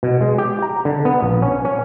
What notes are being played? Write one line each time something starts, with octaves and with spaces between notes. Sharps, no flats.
B2
G#3
G4
A#5
D3
B3
A#1
C#4
C#4